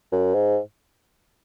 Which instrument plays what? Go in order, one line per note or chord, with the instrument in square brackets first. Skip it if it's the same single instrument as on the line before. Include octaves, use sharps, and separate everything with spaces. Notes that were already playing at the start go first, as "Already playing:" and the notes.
[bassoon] F#2
G#2